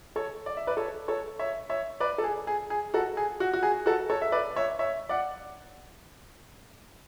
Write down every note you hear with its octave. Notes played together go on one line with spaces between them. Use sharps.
A4 C#5
D5
E5
B4 D5
A4 C#5
A4 C#5
C#5 E5
C#5 E5
B4 D5
A4
G#4
G#4
G#4
F#4 A4
G#4
F#4
F#4
G#4
F#4 A4
A4 C#5
E5
B4 D5
C#5 E5
C#5 E5
D5 F#5